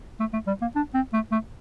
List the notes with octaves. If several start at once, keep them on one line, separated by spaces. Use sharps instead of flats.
A3
A3
G3
A#3
D4
C4
A3
A3